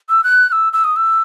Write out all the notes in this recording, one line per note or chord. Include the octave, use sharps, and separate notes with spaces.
E6
F#6
F#6
E6
E6
D#6
E6